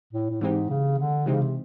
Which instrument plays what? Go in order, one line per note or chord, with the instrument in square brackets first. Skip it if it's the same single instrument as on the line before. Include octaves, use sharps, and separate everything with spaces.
[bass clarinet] A2
A2
[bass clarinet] G#2 [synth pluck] E3 G#3 C4 D#4 G4
[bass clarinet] C#3
D3
[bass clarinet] C3 [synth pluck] E3 G#3 C4 D#4 G4
[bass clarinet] C#3
C3